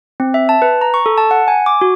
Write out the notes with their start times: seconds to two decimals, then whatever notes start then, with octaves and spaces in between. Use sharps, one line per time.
0.20 C4
0.34 E5
0.49 A5
0.62 B4
0.81 A#5
0.94 C#6
1.06 A4
1.18 A5
1.31 F#5
1.48 G#5
1.66 D6
1.81 F#4